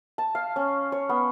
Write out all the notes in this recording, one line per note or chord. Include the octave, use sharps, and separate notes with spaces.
A5
F5
C#4
C#5
B3